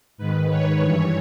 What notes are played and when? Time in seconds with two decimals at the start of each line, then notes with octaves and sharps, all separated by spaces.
0.18 G#2 D#3 B4
0.50 C#5
0.82 G2 E3